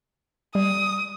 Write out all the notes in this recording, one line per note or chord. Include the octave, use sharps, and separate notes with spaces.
G3 D#6